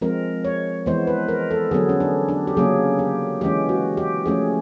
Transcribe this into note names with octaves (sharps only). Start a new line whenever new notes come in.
F3 G#3 C4 A#4
C#5
E3 G#3 B3 C5
B4
A#4
A4
D3 F#3 B3 G#4
C#4
D4
D4
G4
C#3 F#3 A#3 C#4 G#4
G4
E3 G#3 C#4 G4
F#4
G4
F3 A3 C#4 G#4